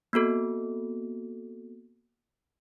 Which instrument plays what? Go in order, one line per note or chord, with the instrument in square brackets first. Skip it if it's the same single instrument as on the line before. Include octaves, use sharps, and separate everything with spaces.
[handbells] A#3 B3 F#4 A4